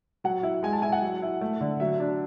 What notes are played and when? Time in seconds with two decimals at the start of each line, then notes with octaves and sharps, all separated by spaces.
0.24 F#3 F#5
0.43 E4
0.63 G#3 G#5
0.73 A5
0.82 E4 G#5
0.92 F#5
1.02 F#3
1.22 E4
1.41 A3
1.61 D3
1.80 F#3 E5
2.00 D4